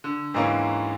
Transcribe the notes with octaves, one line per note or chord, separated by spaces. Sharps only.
D3
D2 G#2 D3 E3 A#3 C#4